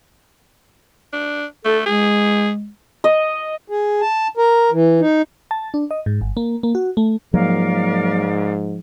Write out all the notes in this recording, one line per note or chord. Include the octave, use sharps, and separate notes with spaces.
D4
A3 A4
G#3 G#4
D#5
G#4
A5
A#4
E3
D#4
A5
D4
D#5
G#2
G1
A#3
A#3
F#4
A3
G#2 F3 F#3 A#3 A#4 D5 F5